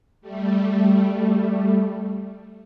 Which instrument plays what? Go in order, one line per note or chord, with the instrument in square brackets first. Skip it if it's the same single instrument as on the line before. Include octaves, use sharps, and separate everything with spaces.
[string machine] G3 A3